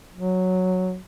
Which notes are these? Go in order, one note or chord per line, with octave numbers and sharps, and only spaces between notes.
F#3